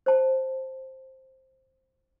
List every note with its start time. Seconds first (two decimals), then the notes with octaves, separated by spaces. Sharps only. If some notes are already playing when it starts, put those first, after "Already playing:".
0.06 C5 A5